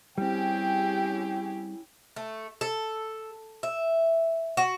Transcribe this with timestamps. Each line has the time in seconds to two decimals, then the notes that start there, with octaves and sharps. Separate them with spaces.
0.18 G3 C4 C#4 E4 G4 G#4 G5
2.16 A3
2.61 A4
3.63 E5
4.57 F#4